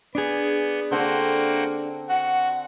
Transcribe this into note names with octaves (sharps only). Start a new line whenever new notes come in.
B3 D4 G#4
D3 A#3 C4 F#4 G5
F#4 F#5